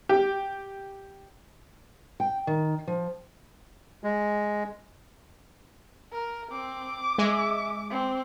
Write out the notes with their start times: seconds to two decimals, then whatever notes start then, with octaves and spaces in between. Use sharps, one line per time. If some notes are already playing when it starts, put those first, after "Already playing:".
0.09 G4
2.20 G5
2.47 D#3
2.88 F3
4.04 G#3
6.13 A#4
6.52 C4 D6
7.18 G#3 E5
7.90 C4